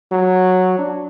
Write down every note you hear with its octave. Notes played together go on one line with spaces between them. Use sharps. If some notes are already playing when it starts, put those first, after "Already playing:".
F#3
D4